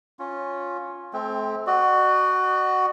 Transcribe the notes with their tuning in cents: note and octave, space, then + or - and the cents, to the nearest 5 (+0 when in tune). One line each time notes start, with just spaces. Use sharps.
C#4 +0 F4 +15
A3 -40 C4 +0 G5 +20
F#4 +10 D#5 -45